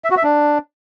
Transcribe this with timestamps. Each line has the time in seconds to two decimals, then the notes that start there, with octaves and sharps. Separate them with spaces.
0.04 E5
0.11 F#4
0.17 E5
0.23 D4